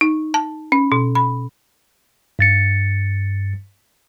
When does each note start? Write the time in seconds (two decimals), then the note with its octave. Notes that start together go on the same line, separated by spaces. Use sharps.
0.01 D#4
0.34 A5
0.72 C#4
0.92 B2
1.15 B5
2.39 G2 A6 C#7